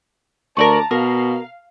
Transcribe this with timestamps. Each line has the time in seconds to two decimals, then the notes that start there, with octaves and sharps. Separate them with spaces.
0.57 D2 A#4 D5 A5 A#5 C#6
0.91 B2 A#4 F5